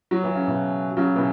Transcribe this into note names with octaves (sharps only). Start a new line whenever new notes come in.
F#3
E3
C#3
B2 E3
C#3 F#3
B2 E3